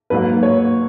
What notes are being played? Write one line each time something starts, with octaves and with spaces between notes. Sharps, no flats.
G#2 F#3 A#3 B4
C#5